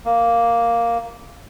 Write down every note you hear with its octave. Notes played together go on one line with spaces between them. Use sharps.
A#3